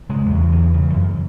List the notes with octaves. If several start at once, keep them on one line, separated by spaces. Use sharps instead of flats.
C#3 G#3
E2 F#3
E2
E3
C#3
C#3
F#2